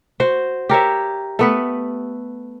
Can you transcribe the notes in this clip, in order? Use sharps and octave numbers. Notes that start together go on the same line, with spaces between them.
F#4 C5
G4 A#4 C#5 E5
A3 B3 B4